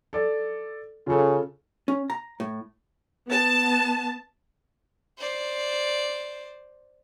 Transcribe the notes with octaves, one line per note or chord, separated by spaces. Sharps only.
A4 D5
C#3 F4 A4
C#4
A#5
A2
B3 A5
C5 D5